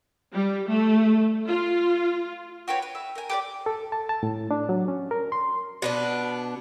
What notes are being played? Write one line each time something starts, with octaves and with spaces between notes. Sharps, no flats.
G3
A3
F4
F#4 G4 B4 C#5
B4
E5
A#4 G#5
G4 B4 D5
A4
A5
A5
A2
D4
F#3
C#4
A#4
C6
B2 B3 D4